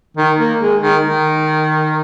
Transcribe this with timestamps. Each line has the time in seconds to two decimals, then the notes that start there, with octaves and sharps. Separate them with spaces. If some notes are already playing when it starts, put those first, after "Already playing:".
0.17 D#3
0.38 A#3
0.60 G#3
0.82 D#3
1.04 D#3